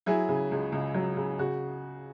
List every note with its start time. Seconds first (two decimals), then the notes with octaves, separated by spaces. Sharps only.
0.06 F#3 E4 G#4
0.29 C#3
0.51 C#2
0.72 C#2
0.94 F#3
1.17 C#3
1.39 C#3 F#4